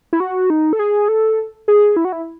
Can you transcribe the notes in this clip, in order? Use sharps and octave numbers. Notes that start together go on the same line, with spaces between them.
E4
F#4
D#4
A4
G#4
A4
G#4
E4
F#4
E4